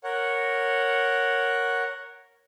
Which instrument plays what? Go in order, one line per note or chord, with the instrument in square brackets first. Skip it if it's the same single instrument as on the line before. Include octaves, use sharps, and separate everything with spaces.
[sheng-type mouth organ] A#4 C#5 F#5